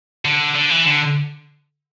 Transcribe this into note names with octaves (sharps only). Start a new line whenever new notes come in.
D3
D3
E3
D3